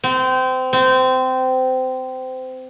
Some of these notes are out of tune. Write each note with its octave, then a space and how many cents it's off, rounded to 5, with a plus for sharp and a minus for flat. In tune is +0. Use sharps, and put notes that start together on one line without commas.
C4 -25
C4 -20